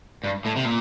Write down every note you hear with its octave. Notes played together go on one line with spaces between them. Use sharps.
G2
A2
C3
A#2